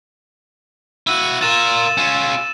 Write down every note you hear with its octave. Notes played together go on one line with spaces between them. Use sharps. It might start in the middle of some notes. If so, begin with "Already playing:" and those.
E4 F#4 E6 D#7
F4 A#4 A6 D#7 E7
C#4 F4